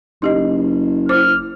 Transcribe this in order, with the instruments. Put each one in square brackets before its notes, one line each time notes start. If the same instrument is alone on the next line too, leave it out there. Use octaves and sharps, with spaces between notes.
[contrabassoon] F#1 [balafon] D#4 G4 D#5
[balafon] E4 C5 D6 [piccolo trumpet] F6